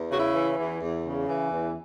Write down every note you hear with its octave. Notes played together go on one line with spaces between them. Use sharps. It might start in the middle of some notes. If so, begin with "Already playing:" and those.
Already playing: E2
C#3 F#4
E4
E3
E2
E2
C#3
E3
E2